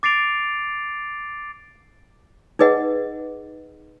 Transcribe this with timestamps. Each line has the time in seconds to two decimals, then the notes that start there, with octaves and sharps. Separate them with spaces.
0.03 D6 A6 C7 D7 F7
2.59 D#4 G#4 B4 D#5 F#5